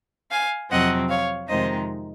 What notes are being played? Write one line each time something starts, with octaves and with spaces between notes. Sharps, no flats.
F5 G#5
F2 C3 F#3 C4 D#5 F#5
C#5 F5
F2 C3 D#3 G#3 D#4 C5 D#5